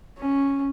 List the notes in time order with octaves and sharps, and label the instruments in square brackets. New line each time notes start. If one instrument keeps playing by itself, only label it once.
[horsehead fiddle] C#4